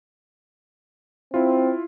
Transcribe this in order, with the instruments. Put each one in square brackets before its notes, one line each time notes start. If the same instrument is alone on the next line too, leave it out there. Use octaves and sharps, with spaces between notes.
[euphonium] C4 [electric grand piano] E4 F4